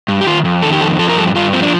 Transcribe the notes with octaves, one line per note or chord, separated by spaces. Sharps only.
G2
G4
D#3 F4
F2
D#3 A4
G4
F2 A4
F3 A4
A#4
G2 A4
G2 F4
F3 C4
D4